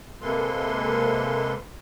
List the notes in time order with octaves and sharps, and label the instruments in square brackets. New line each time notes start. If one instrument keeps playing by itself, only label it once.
[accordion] C3 G#3 A#3 A4 B4 C6